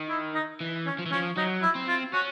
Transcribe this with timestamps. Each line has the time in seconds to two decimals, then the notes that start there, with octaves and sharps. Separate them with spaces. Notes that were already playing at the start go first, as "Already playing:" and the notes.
Already playing: D#3
0.09 E4
0.35 D#4
0.61 E3
0.86 C#4
0.99 F3
1.06 E3
1.12 F3 C#4
1.37 F#3 D#4
1.62 E4
1.75 C4
1.88 F4
2.13 C#4 F#4